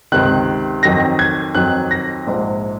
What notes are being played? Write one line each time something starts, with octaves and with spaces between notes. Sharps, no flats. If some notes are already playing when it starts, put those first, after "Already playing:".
C#2 C3 D#3 F#6
F2 D#3 F#3 A#6
G#6
F2 D#3 F#3 F#6
A#6
A#1 G#2 F3